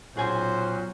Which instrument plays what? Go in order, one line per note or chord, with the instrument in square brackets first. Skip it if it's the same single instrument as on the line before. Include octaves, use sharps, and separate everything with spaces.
[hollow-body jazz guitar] B1 G#4 G#5 [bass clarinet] A#2 [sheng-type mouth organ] C#4 F#4 [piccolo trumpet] C5